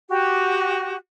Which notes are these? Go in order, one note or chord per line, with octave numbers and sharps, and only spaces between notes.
F#4 G4